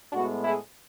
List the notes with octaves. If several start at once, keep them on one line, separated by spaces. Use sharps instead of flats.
A2 G#3 B3 D4 F#4
E4 G#4